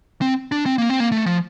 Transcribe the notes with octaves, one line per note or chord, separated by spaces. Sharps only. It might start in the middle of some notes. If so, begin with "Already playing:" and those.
C4
D4
C4
A#3
C4
A#3
A3
F3